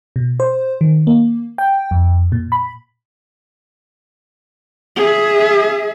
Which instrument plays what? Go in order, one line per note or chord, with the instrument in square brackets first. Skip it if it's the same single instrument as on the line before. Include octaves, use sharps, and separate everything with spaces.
[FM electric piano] B2
C5
D#3
A#3
G5
F2
A#2
B5
[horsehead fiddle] G#4 E5